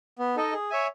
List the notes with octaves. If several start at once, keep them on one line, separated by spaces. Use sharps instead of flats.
B3
D#4 A4 D#5
G#4
C#5 E5 G#5